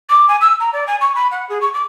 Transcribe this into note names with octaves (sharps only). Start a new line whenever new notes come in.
D6
G#5
E6
A#5
D5
G#5
C#6
B5
F#5
G#4
C#6
D6